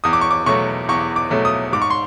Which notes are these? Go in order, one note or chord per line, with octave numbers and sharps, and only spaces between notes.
E2 D#6
D6
C#6
D6
B2 F#3 A3 C#6
E2 C#6
D6
B2 F#3 A3
D#6
G#2 D6
C#6
C6